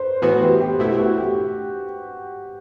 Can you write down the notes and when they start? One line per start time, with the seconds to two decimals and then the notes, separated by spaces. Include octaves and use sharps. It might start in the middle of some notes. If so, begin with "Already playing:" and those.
Already playing: B4 C5
0.22 A2 E3 B3 F#4 B4
0.41 G4
0.60 G4
0.79 B2 A3 E4 G4
0.98 F#4
1.17 G4